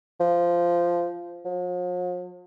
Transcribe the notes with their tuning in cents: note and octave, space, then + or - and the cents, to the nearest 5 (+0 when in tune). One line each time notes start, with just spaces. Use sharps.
F3 -10
F3 +45